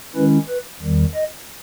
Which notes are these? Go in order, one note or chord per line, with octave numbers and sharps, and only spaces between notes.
D#3 G#3 C#4 E4 B4
B4
E2 D#3 G3
D#5